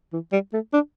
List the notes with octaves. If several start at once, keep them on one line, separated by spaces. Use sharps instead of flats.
E3
G3
A3
D4